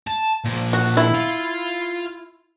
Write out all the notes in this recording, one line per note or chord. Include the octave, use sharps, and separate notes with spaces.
A5
A#2 F3
F#4
E4
F4